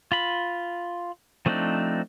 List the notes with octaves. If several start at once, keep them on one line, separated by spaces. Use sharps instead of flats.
F4 B5
F3 A3 C4 D4 D#4